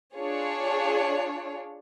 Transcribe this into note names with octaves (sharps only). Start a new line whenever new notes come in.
D4 F4 G#4 C#5